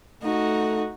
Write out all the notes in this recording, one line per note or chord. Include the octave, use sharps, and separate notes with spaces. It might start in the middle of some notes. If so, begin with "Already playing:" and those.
A3 D#4 F#4